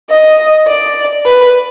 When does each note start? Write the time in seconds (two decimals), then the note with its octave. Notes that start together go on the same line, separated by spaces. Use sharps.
0.10 D#5
0.67 D5
1.25 B4